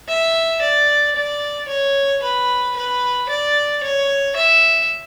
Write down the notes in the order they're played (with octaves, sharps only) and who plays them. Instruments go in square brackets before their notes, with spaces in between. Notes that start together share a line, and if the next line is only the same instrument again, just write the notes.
[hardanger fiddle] E5
D5
D5
C#5
B4
B4
D5
C#5
E5